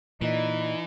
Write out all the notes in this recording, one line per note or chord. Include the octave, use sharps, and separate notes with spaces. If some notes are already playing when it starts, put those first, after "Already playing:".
A#2 E3 D#4 D5 D#5 B5